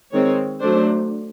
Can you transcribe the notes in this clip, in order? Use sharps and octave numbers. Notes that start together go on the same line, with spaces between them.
D#3 G#3 C4 C#5
F#3 A3 D4 C5